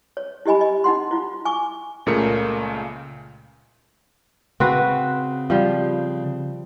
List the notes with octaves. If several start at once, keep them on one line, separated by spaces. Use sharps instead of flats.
C#5
E4 G4 D#5 G#5 B5
D#5
D#4 E4 F#5 C6
E4 F4
G#5 C#6 D6
C#2 A#2 C#3 A3 A#4 C#7
C#3 C4 F#4 B4
F3 G3